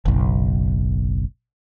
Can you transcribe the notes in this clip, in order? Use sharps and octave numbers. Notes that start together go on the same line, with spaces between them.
F#1 B1